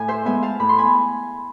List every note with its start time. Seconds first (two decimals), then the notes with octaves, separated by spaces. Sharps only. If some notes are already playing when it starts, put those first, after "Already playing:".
Already playing: A2 G#5
0.08 C5 E5
0.25 G#3 B3 E5 G#5
0.42 F5 A5
0.60 A2 B5
0.69 C6
0.78 G#5 B5